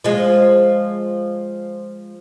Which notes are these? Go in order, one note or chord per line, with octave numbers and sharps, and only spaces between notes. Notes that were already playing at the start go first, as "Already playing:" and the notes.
F3 G#3